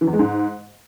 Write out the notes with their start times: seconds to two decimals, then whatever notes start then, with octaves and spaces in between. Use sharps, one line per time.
0.01 E3
0.07 E2
0.13 G#3
0.19 G#2